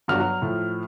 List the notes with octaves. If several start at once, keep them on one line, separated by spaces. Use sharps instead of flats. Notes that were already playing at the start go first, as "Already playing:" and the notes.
G1 G2 F#3 F#4 F6
F#3
A2 F3